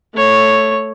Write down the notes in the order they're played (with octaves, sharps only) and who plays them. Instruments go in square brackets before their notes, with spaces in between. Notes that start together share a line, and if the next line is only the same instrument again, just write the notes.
[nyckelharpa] A3 C#5